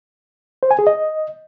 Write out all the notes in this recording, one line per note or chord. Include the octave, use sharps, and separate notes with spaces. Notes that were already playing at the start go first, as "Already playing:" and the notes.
C5
G#5
G#4
D#5